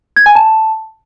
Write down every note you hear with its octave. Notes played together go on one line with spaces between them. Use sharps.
G#6
G#5
A5